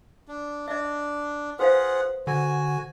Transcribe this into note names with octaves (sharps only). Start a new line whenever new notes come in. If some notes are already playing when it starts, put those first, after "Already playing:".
D4
D4 D#5 E5
F4 G#4 B4 C5 F5 F#5
D3 F#4 G#5